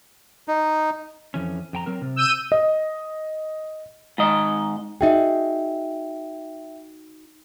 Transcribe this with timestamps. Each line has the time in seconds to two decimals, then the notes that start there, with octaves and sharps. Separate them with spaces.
0.48 D#4
1.34 F2 E3 C#4
1.73 F2 G5 A#5
1.86 F#3 C4 A#4
2.02 C3
2.16 E6 G6 D#7
2.52 D#5
4.18 G#2 D#3 D#5
5.01 D#4 F#4 G#4 E5 G5